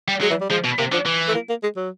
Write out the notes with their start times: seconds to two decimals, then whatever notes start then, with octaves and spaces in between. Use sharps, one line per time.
0.08 G3
0.21 F#3 G#3
0.30 E3
0.41 G3
0.50 F3 G#3
0.64 B2
0.78 C3 A#3
0.92 D3 F3
1.06 E3
1.28 A3
1.34 A#3
1.49 A#3
1.63 G#3
1.76 F#3